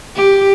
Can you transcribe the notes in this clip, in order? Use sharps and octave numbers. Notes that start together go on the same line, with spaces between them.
G4